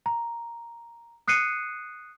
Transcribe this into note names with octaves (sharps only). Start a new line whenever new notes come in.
A#5
D#6 F#6 C7 C#7 D#7